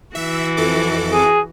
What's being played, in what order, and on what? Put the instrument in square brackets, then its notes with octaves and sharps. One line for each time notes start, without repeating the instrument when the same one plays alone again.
[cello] E3 F#4 [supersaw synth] E5
[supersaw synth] F2 A4 D6
[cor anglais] G#4